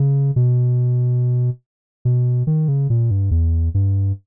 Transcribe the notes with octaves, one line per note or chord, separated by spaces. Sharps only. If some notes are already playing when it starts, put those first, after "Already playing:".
Already playing: C#3
B2
B2
D#3
C#3
A#2
G2
E2
G2